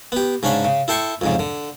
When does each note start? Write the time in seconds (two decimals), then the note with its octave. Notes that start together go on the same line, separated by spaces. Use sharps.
0.12 B3 G4
0.43 G#2 C#3 C#4 D4 B5
0.64 C#3
0.88 E4 A4 G5 C6 C#6
1.21 F2 G#2 C#3
1.39 D3